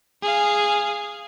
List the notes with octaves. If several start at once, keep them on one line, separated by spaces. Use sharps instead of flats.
G#4 F5